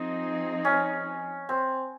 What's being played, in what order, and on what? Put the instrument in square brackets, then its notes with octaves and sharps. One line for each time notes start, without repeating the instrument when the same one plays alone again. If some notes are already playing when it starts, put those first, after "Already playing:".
Already playing: [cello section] F3 C4 D#4 G#4
[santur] C#4
C4